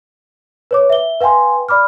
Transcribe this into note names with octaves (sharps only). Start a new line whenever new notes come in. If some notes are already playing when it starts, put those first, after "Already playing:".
B4 C#5 D6
E5 G7
B4 F5 G5 G#5 C6
D5 B5 D6 F6